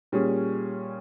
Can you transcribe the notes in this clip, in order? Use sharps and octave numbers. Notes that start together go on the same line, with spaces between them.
A#2 G3 C#4 G#4